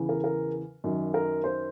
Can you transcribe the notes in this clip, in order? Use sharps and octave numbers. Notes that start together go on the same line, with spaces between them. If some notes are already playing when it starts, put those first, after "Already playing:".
Already playing: E2 C#3 E3
A#4
A#4
F#2 D#3
A#4
C5